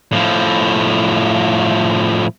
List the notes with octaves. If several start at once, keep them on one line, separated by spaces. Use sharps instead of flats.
A2 F3